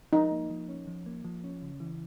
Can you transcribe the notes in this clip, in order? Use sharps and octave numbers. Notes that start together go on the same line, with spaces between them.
F3 D#4
A#3
F3
C#4
F3
A#3
F3
C#4
C#3
E3